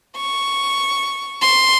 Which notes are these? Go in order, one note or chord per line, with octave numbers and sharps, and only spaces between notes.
C#6
C6